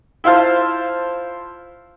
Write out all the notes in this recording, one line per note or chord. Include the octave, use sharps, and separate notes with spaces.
E4 F4 C5 F5 A5